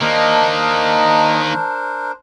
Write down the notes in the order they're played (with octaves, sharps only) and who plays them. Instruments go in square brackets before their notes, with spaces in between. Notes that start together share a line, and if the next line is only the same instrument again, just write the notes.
[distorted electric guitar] D#3 A#3 [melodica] D4 A#4 C5 [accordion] D#5 A#5 [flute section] A5